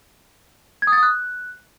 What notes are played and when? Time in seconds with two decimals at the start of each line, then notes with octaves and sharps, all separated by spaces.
0.82 G#6
0.87 D#6
0.92 A6
0.98 D#6
1.03 F#6